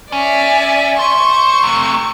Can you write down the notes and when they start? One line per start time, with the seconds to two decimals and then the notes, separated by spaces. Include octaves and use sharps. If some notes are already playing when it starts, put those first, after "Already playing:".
0.12 C#4 D5 E5
0.99 C5 C#6
1.63 C3 A3